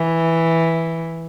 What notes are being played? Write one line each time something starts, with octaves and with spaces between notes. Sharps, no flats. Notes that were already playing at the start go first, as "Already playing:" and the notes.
Already playing: E3